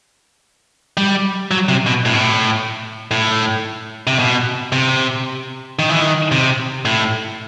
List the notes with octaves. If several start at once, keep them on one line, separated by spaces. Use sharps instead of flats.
G3
F#3
C3
B2
A2
B2
A2
A2
C3
B2
C3
D#3
E3
D#3
C3
A2